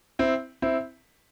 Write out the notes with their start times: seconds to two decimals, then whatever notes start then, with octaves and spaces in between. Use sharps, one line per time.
0.19 C4 E4
0.62 C4 E4